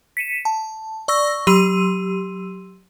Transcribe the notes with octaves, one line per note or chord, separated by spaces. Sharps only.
B6 C#7 D#7 E7
A5
D5 C#6 E6 A#6
F#3 G4 C6 E6 D#7